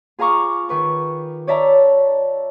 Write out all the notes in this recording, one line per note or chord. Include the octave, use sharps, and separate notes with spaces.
F4 G#4 F5 A#5 C#6 D6
D#3 B4 C#6
C#5 D5 E5 A5 A#5